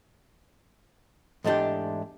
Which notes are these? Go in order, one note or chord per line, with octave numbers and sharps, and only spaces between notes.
E2 G#2 A3 D4 G4